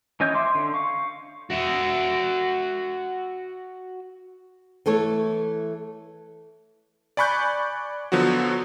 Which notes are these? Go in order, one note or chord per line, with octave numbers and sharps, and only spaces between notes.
E3 C#4 D#5 G#5 G6
E5 C6 D6
D3
F5 C#6
F#4 E5
E3 A3 A4 C#5
D5 G#5 B5 C#6 F#6 G6
D3 F3 F#3 B3 F#4